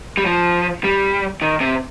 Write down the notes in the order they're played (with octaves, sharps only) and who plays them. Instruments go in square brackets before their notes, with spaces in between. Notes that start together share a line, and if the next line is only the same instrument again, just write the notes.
[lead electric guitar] G3
F3
G3
D#3
C3